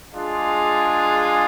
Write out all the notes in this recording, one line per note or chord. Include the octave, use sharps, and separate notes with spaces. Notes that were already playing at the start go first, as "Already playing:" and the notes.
G#3 D4 F4 G#4